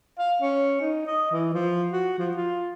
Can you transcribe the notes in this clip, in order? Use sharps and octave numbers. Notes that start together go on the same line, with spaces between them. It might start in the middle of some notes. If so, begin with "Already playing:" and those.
F5
C#4
D#4
D#5
E3
F3
F#4
F3
F4